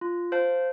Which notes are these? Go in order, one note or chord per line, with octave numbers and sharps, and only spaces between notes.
F4
C5 F5 A5